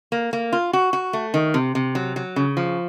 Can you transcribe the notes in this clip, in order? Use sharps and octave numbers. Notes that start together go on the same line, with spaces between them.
A#3
A#3
F4
F#4
F#4
A3
D#3
C3
C3
F#3
F#3
C#3
F3